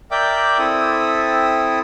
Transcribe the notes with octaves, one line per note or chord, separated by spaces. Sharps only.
A#4 D5 E5 G5 D6 G6
C4 E4 A4 D#6